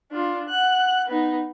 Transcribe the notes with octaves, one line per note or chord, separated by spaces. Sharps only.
D4 F4
F#5 F#6
B3 D#4